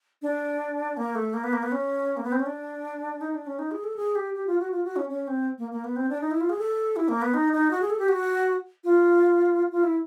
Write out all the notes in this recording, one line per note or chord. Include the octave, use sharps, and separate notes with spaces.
D4
A#3
A3
A#3
B3
A#3
B3
C#4
A#3
B3
C4
C#4
D4
D#4
D4
C#4
D#4
G#4
A4
G#4
G4
G4
F4
F#4
F4
F#4
C#4
C#4
C4
A#3
A#3
B3
C4
D4
D#4
E4
F4
G#4
A4
E4
A#3
B3
D#4
D#4
F#4
G#4
A4
G4
F#4
F4
F4
E4